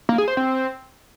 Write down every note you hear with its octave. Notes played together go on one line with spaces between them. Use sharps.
A#3
G#4
C5
C4